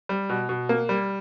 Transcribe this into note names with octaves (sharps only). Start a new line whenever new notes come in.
G3
B2
B2
A#3
G3